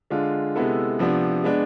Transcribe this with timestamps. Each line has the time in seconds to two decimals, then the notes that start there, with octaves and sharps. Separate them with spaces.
0.10 D3 G#3 D4 F4
0.55 C3 G#3 B3 E4 A4
0.99 C3 F3 B3 D4
1.44 G#3 B3 D4